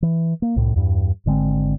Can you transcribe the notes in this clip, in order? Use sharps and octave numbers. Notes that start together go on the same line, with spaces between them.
E3
A#3
C2 A2
E2 G2
G#1 D3 G#3 C4